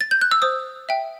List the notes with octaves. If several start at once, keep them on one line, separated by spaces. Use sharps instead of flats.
A6
G6
F#6
E6
C5 D#6
E5 G5